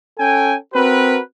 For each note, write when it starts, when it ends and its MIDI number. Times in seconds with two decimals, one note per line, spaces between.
0.19 0.55 61
0.19 0.55 69
0.19 0.55 79
0.19 0.55 80
0.74 1.19 60
0.74 1.19 66
0.74 1.19 70
0.74 1.19 71